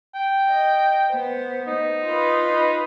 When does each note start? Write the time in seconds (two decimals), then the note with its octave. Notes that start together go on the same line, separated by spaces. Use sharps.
0.15 G5
0.48 D#5
1.09 B3 C5
1.67 D#4
2.04 F4 B4
2.47 D#4